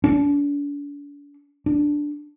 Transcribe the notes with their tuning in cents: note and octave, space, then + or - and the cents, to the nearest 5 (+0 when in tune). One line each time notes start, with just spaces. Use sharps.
D4 -40
D4 +0